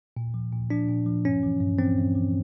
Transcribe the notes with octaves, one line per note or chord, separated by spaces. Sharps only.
A#2
F3
A#2
F3 D4
A#2
F3
G2 C#4
E3
G2
E3 C4
G2
E3